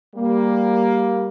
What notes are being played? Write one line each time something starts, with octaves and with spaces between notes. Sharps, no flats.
G3 A#3